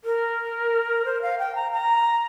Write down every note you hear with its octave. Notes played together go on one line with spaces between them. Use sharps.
A#4
C5
F5
G5
A#5
A#5